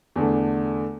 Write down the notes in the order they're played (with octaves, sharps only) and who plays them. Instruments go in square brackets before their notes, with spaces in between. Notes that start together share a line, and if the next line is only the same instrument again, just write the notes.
[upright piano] E2 D3 A3